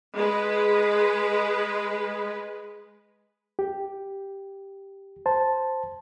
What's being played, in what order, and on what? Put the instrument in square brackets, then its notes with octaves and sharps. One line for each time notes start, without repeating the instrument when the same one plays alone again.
[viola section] G#3 B4
[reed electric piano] G4
C5 A5